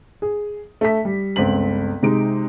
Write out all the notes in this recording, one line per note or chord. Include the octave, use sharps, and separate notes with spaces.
G#4
A3 E5 B6
G3
G1 C#2 C4 B6 F#7
C3 G#3 D#4 D7